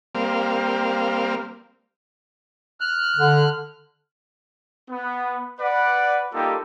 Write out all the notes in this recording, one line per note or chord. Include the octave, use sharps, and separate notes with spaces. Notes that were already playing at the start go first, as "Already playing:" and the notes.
G3 A#3 C4 F5
F6 F#6
D3
B3
B4 D5 F#5
G3 A#3 D#4 F4 G4 A4